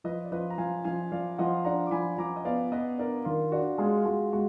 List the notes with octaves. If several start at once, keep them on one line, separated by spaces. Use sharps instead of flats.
F3 B4 D#5
D5
F3 B4 D#5
A#5
F3 F5 G#5
F3 F5 G#5
F3 D5 F5
F3 D#5 F#5
D4 F#5 A#5
D6
F3 G#5 B5
F3 A#5 D6
D#5
B3 D5 F5
B3 B4 D#5
D4 A#4 D5
D#3 F4
D4 F#4
G#3 F4 G#4
F4
G#3 F#4
G#3 F#4